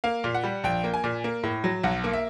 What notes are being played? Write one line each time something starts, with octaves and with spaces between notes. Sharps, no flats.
A#3 F5
A#2
F#5
G3
A#1 G5
A#3
G#5
A#2
A#3
A2
F#3
B1 F#5
A#3
E5